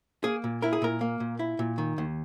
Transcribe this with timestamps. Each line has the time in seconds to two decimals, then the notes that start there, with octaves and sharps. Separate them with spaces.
0.24 A#3 G#4
0.44 A#2
0.62 E4 A#4
0.73 G#4
0.82 A#2 A#4
1.01 A#3
1.20 A#2
1.39 E4
1.59 A#2
1.78 D#3
1.98 D#2